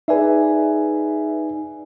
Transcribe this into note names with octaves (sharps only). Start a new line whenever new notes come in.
D#4 G#4 B4 D5 E5 G#5